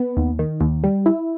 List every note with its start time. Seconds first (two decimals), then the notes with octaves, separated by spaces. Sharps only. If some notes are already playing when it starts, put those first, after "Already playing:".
Already playing: B3
0.17 D#2
0.39 D#3
0.61 D#2
0.84 G3
1.06 E4